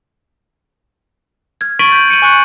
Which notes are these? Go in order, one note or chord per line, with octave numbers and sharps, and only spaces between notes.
F6 G#6
C#6 A6 B6 D7 D#7 F#7
G6
C#7 D#7 F#7
G#5 C#6 F#6 C#7